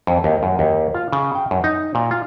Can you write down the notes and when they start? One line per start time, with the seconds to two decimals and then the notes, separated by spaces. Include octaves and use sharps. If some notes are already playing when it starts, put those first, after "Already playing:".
0.07 F2
0.24 D#2
0.43 F#2
0.59 D#2
0.95 F4
1.12 C#3
1.35 G5
1.51 F#2
1.64 D#4
1.95 A#2
2.11 F4